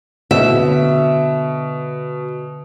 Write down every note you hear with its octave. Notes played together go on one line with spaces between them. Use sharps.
B2 D3 E5